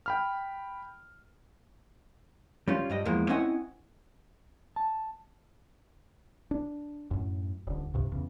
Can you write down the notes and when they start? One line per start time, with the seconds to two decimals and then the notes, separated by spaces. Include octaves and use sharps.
0.06 G5 B5 F6
2.68 G3 C#4 F4
2.90 G2 G3 D#5
3.05 E2 E3 F3 G#3 A#3
3.29 C4 C#4 E4 D#5 F#5 G#5
4.76 A5
6.51 D4
7.11 F#2 A2
7.67 D#1 D3
7.94 C#2 G2 C3
8.12 E2 C#3